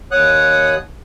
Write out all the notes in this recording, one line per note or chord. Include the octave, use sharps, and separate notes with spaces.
D#2 C#5 F#5 D#6 F#6